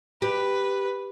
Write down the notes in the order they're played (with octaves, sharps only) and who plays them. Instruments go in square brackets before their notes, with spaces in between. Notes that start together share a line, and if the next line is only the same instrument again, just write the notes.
[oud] G4 [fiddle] B4